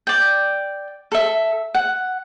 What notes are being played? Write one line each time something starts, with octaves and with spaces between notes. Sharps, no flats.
D5 G5
A4 E5
F#5